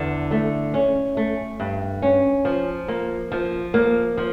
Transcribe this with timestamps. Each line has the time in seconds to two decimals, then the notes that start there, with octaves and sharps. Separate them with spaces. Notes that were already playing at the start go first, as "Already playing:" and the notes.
Already playing: E2 D3
0.31 A3
0.74 C#4
1.17 A3
1.60 G2
2.02 C#4
2.45 F3
2.88 A#3
3.32 F3
3.74 A#3
4.17 F3